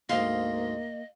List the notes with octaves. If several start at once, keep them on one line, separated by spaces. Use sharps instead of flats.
D2 G#2 A#3 D#5 F5 C6